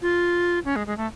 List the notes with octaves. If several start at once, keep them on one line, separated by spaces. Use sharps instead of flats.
F4
C#4
G#3
G#3
A3